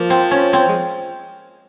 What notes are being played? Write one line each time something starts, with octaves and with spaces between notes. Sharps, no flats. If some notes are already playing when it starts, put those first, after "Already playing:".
Already playing: F3 A#3
C4
C#4
C4
G#3